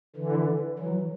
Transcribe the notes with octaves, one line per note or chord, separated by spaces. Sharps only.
D3 E3
E3 F#3